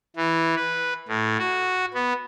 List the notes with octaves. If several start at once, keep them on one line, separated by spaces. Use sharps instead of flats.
E3
B4
A2
F#4
B3